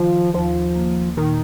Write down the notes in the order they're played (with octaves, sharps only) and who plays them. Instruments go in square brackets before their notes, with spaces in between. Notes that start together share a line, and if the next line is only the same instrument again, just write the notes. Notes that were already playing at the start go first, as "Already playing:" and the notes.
Already playing: [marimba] D#3 [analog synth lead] F3
[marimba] D#2 [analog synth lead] F3
[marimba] A#3
[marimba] A#2 [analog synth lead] D#3